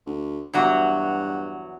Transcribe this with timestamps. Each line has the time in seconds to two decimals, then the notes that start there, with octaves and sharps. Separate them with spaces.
0.06 D2
0.53 E2 G2 F#3 F#4